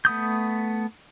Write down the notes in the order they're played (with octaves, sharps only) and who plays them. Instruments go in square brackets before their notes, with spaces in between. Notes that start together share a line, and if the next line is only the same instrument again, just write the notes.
[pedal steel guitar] A3 B3 D#6 G6